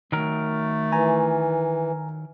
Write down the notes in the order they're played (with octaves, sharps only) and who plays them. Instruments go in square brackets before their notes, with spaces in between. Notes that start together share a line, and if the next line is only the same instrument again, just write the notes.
[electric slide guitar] D#3 F#3 A#4 [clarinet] A3
[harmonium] E3 [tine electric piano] G#5 A#5